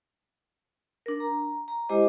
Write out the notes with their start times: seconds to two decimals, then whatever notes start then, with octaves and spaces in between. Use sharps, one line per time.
1.06 D4 A#4
1.20 A#5
1.68 A#5
1.89 G#3 E4 G4 C5 D#5 D6